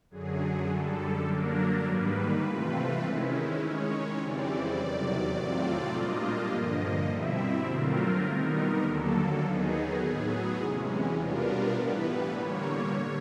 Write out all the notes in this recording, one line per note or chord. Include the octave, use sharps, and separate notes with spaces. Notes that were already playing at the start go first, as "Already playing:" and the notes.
F#2 D3 F#3 G#4
F#2 D3 G3 A4
D3 F#3 A#3 D4 A#4
G#2 D#3 G3 A#3 B4
C3 E3 A3 C4 F4
D#3 G#3 C#4 E4
D#3 G#3 C#4 C#5
F2 C#3 E3 G3 C4 D5
E2 C3 D#3 F#3 D5
A2 F#3 A3 C4 F4
A#2 G3 A#3 D4 F4 D#5
G2 D3 F3 A#3
B2 G3 C4 E4 E5
D3 F#3 A3 C4 F4 A#4
D#3 G3 B3 D#4
D#2 D3 F#3 A#3 A4
D#3 F#3 B3 D#4 G#4
A2 F#3 B3
E2 C3 E3 G#3 C#4
B2 G3 B3 D4 F4 A#4
A2 E3 G3 B3 B4
D3 G3 A#3 C#5
D3